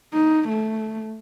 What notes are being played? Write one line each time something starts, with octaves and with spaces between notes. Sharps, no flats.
D#4
A3